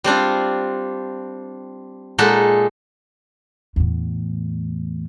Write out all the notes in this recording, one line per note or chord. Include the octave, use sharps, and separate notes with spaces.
G3 C4 D4 F4
A#2 G#3 D#4 A4 F#5 B5
E2 A2